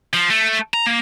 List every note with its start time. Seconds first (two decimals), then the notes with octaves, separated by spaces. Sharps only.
0.13 F3
0.30 A3
0.74 A#5
0.86 A#3